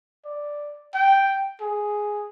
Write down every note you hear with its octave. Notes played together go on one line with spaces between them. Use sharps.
D5
G5
G#4